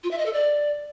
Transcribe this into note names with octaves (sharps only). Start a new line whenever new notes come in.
F4
E5
D#5
A4
D5